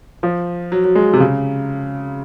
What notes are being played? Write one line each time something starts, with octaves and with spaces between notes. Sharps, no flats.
F3
F#3
F#3
G#3
C3
C#3